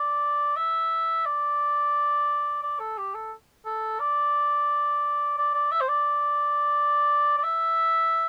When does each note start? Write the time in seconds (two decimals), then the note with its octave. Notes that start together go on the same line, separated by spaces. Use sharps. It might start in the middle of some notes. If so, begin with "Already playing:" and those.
Already playing: D5
0.56 E5
1.25 D5
2.63 D5
2.79 A4
2.98 G4
3.14 A4
3.65 A4
4.00 D5
5.38 D5
5.54 D5
5.72 E5
5.81 C5
5.88 D5
7.38 D5
7.44 E5